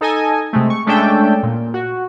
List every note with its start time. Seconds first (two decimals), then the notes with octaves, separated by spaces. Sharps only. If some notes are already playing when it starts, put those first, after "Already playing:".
0.01 D#4 A4 D#5 G#5
0.53 C3 G#3 A3
0.70 C#6
0.86 G#3 A3 C#4 D4 A4 G5
1.43 A#2
1.74 F#4